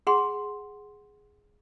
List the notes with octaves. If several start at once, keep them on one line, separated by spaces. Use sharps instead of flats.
G#4 F#5 C6